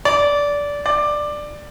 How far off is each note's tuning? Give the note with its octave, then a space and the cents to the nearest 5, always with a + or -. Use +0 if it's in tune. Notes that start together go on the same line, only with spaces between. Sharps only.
D5 -20
D5 +10